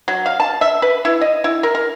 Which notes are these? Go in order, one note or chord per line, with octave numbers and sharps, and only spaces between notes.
F#3
F5
A5
E5
B4
E4
D#5
E4
A#4
A#4